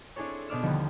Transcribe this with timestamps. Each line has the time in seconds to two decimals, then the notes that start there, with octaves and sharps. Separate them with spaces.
0.16 C4 D4 E4 G#4 A4 C#5
0.49 B2 B3 D4 D5 F6 E7
0.63 D#2 D3 F3 G3 C4